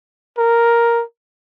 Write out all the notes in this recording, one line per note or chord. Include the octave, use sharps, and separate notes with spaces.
A#4